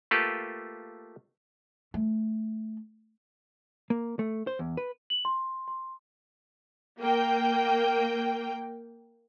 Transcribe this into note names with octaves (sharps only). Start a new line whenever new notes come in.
A3 A#3 F4 G4 A4 B4
A3
A#3
A3
C5
E2
B4
F#7
C6
C6
A#3 G5